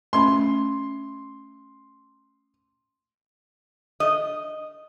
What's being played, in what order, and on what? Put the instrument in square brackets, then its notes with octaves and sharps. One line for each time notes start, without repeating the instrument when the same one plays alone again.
[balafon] A3 C#4 B5 [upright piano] C6
[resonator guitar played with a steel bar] D#5